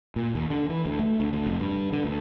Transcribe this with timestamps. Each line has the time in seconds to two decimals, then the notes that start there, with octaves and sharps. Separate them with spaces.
0.16 A#2
0.35 D#2
0.50 D3
0.69 E3
0.86 D2
0.99 A3
1.20 D2
1.33 D2
1.46 F1
1.59 G2
1.92 D3
2.04 D2